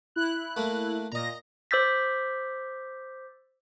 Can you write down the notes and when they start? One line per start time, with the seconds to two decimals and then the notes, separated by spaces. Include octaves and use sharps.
0.16 E4 F#6
0.57 A3 A#3
1.12 A#2 D#5 A#5 A#6
1.71 C5 D6 E6 G6 A6 B6